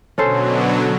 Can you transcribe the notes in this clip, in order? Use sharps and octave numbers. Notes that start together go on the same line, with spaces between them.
B2 D3 F#3 C#4 A4 C5